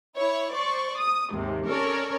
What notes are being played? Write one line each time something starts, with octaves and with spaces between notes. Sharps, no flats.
E4 C#5
C5 D5 C#6
D#6
D#2 G#2 C3
C#4 A4 A#4 C#5 D5